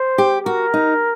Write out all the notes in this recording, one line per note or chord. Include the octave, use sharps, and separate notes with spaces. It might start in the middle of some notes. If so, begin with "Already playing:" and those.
Already playing: C5
G4
F#4 A#4
D#4